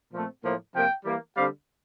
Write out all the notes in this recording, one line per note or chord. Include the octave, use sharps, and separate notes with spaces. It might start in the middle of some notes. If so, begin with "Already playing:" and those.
A#2 F3 A3 C4
A2 F3 A#3
C3 F3 A#3 G5
E3 G3 A#3
D3 G3 C4 F5